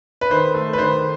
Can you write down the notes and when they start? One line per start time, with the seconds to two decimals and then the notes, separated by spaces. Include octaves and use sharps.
0.21 B4
0.31 D#3 C5
0.54 A3
0.73 B4
0.78 D#3 C5